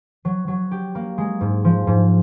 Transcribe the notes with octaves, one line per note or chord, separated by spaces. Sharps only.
F#3
F#3
G4
A#3
G#3
G#2
F3
G#2